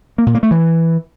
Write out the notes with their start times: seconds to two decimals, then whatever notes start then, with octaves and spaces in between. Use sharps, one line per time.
0.18 A#3
0.27 A#2
0.35 A#3
0.43 A3
0.51 E3